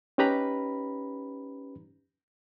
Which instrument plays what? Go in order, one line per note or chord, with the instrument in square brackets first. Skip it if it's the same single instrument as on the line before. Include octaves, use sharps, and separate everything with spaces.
[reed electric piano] C#4 D#4 G4 B4 A#5 B5